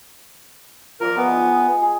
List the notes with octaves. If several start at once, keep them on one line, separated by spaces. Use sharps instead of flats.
F3 A#4 D5 D6
G#3 B3
D#4 D#6
G#4